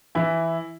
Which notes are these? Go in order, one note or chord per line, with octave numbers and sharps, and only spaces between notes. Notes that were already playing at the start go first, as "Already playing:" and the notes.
E3 E4